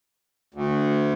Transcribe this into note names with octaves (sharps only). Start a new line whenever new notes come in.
D2